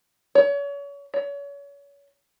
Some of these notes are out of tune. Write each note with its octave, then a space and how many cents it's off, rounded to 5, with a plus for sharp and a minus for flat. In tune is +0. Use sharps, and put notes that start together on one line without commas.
C#5 +35
C#5 +35